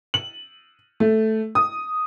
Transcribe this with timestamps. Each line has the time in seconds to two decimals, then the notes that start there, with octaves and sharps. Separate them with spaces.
0.14 F#7
1.00 A3
1.55 D#6